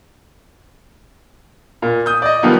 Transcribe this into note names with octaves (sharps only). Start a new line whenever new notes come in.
A#2
D#6 G6
D5 D#5
D#3 F3 G3 A#3 B3